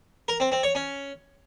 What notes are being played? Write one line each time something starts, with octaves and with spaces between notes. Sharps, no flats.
A#4
C4
C4
C#5
C#4